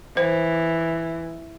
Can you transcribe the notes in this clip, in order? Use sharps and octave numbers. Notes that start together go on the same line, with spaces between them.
E3 C5